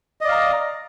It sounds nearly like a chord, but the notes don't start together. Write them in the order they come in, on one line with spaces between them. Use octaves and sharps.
D#5 D5 F5 A#5